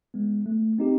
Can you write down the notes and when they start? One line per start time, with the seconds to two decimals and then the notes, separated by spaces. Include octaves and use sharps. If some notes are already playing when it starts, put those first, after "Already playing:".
0.14 G#3 B3
0.46 A3
0.78 C4 D#4 G4